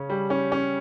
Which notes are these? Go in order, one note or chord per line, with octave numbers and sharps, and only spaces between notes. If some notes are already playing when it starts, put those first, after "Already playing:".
Already playing: C#3 C#4
G3
C#4
C#4